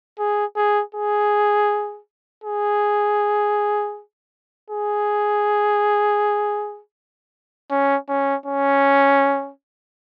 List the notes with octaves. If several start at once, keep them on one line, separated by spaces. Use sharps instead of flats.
G#4
G#4
G#4
G#4
G#4
C#4
C#4
C#4